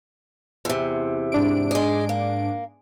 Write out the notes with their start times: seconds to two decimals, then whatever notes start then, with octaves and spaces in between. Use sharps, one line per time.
0.65 E2 C3
1.32 G#2 D4 D7
1.71 G#3 G#4
2.09 A#3